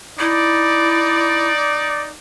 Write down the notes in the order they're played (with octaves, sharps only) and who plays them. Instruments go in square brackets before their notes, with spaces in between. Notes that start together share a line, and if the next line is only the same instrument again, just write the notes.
[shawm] D#4 [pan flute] E4 [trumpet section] D5